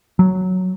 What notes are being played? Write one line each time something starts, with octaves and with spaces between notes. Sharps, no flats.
F#3